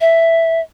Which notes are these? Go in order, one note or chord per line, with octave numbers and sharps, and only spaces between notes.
E5